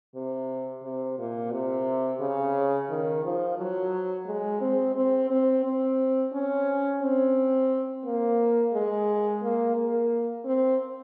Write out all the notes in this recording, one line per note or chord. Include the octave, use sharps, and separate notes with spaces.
C3
C3
A#2
C3
C#3
D#3
F3
F#3
G#3
C4
C4
C4
C4
C#4
C4
A#3
G#3
A#3
A#3
C4